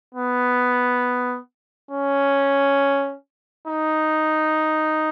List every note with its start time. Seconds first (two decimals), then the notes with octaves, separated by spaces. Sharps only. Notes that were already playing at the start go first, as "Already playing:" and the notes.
0.15 B3
1.91 C#4
3.68 D#4